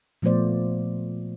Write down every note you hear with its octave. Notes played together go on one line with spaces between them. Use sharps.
A#2 F3 A3 B3 C5 D5